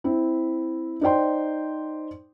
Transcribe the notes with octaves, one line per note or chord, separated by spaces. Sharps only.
C4 E4
D#4 C5 D5 G5 C6